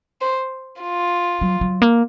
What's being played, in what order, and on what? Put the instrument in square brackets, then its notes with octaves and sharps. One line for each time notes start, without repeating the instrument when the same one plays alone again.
[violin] C5
F4
[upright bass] F#3
F#3
A#3